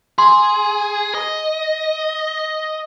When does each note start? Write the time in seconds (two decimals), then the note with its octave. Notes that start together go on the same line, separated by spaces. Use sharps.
0.18 G#4 C6
1.15 D#5